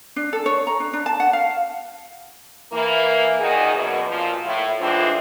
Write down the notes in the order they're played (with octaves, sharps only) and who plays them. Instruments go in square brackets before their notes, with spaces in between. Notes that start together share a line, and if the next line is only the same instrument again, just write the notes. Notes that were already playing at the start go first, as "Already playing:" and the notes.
[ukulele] D4
A4
C#5
A#5
D4
D4
A5
F#5
F5
[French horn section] E3 A#3
A#2 D#3 D#4 F#4 G#4
F#2 B2
A#2 F3
A2
A2 E3 G#3 C4 D4 F4